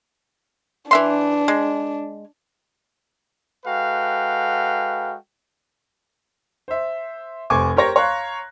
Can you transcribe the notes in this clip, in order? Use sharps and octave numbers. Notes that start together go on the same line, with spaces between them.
E3 D4 E5 C6
G#3
G#3 F#4 A4 B4 F5 G5
C5 E5
F1 C5 G#5 C#6 D6 G#6
G4 A#4 C5 C#5 A#6
C#5 F5 A#5 C6 F#6